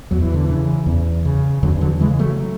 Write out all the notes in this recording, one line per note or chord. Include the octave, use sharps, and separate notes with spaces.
E2 F#3
E3
D3
E3
C#3
E2
C#3
E2 D3 F#3
D3 F#3
C#3 E3 G#3
F#3 A3